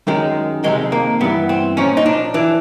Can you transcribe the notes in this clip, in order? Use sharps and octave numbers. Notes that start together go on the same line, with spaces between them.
F#2 D#3 G#3
F2 C3 D#3 G#3
A#3
G2 E3 B3
C4
A#2 F3 C#4
D#4
D4
E3 D4